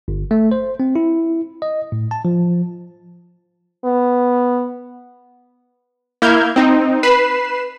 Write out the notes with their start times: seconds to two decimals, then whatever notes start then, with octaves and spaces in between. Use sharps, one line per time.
0.08 G1
0.31 A3
0.52 C5
0.80 C4
0.96 E4
1.62 D#5
1.92 A2
2.11 A5
2.25 F3
3.84 B3
6.22 A#3 E4 F6 G6 G#6
6.56 C4 D#4
7.03 B4 B5 C7 E7